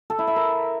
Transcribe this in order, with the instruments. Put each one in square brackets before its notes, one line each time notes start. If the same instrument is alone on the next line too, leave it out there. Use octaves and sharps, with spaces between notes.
[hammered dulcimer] A4
E4
E5
A#4